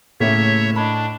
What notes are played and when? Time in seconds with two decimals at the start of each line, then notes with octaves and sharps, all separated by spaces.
0.20 A2 C#3 A3 A#3 C#5 E5
0.76 D4 D#5 B5